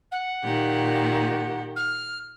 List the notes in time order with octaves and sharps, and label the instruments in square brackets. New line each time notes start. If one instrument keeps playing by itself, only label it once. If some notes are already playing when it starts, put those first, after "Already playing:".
[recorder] F#5
[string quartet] A#2 D#3 G4
[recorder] F6